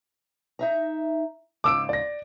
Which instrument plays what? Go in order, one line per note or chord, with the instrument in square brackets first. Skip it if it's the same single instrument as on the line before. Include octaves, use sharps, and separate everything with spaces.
[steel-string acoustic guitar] D#4 E5 A#5
[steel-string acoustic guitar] G#2 C#3 [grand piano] D6 E6 D7
[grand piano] D5 A#6